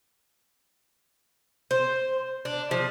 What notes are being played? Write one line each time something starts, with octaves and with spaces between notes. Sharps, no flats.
C5
D4
F3